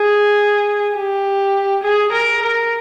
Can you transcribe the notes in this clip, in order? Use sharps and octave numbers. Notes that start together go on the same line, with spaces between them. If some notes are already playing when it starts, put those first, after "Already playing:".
Already playing: G#4
G4
G#4
A#4
A#4